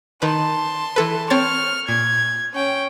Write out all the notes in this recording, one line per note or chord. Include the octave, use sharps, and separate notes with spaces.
D#3 B4 A5 C6
E3 A4 B4
C4 C#5 C#6 F6 A6
A#2 G#6
C#4 G5